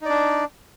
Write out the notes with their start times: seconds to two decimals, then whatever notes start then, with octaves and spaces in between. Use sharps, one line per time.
0.02 D#4
0.06 D5
0.09 D4